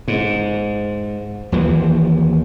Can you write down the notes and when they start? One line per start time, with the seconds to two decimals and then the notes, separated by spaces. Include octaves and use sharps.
0.08 G#2
1.52 D#2 E3 F3